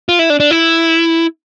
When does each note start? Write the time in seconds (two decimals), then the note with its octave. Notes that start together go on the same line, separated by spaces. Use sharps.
0.09 F4
0.19 E4
0.30 D4
0.40 D4
0.51 E4